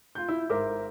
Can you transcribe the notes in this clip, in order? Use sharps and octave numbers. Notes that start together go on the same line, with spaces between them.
F4 G6
E4
G#1 A#4 C5 E5 D6